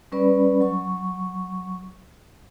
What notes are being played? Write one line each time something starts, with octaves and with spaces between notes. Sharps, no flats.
G3 C#4 B4 D5 B5
F#3 C#6